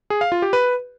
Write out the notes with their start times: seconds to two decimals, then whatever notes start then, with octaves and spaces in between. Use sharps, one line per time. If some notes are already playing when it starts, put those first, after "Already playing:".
0.10 G#4
0.21 F5
0.32 F4
0.42 G4
0.53 B4